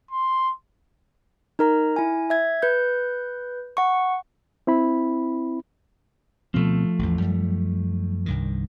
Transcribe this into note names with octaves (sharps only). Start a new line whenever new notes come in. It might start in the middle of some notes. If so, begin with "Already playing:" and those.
C6
D#4 A#4 A#5
E4 G#5
E5 G#6
B4 G6
F#5 C#6
C4 E4 B5
D2 B2 F3 A3 C4
A1 E2
F#2 G3
C2 G2 D#3